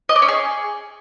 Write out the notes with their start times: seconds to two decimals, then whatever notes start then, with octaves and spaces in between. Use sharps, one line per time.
0.09 D#5
0.16 D5
0.22 C#4
0.28 G#4